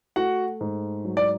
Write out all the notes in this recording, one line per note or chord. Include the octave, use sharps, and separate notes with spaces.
A3 F#4 F#5
G#2
F#3
D5